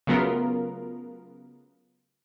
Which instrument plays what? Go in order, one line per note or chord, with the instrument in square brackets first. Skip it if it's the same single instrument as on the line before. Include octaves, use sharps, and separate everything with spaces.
[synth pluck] C#3 F#3 A3 B3 F4 A#4